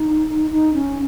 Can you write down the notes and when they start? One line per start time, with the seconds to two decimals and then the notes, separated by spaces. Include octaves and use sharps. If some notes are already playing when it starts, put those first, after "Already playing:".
Already playing: D#4
0.51 D#4
0.74 C#4